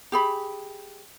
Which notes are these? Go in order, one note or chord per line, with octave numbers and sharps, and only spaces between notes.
G4 G#4 B5